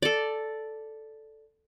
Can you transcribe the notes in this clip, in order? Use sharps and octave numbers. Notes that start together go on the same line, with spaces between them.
A4 D5